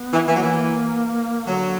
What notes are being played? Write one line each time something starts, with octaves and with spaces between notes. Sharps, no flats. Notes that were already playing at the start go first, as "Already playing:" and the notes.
Already playing: B3
E3
E3 A#3
F#3
E3
D3 F#3